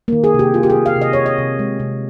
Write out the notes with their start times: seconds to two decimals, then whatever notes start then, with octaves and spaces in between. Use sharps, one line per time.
0.08 D#3 A#3
0.24 G#4
0.34 C3 G4
0.54 A#3 F4
0.63 G4
0.70 G#4
0.76 A#3
0.86 F5
0.96 C3
1.01 D#5
1.13 C3 C#5
1.26 D#5
1.38 C3
1.59 G#3
1.80 C3